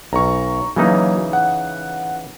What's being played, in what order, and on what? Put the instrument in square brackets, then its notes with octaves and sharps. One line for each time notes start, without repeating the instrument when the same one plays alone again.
[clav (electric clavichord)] B1 [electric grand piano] A#5 C#6
[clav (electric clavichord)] C#3 E3 D#4 [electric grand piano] F#3 A#3
[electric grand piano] F#5